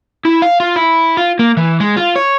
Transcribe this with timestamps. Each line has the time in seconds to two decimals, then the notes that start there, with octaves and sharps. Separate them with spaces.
0.25 E4
0.42 F5
0.60 F4
0.76 E4
1.17 F4
1.39 A#3
1.57 E3
1.80 G#3
1.97 F4
2.16 C#5